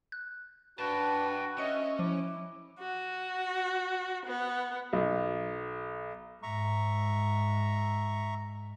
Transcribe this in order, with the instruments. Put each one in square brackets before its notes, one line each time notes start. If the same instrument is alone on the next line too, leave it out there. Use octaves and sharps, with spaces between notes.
[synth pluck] F#6
[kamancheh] D4 B4 [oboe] F#4 [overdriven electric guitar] G5 A5
[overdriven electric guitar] C#4 [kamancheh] D#5 E5 [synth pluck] C#7
[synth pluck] F3 [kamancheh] E4 [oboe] D6
[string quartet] F#4
B3
[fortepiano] B1
[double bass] G#2 [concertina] E5 A#5 C#6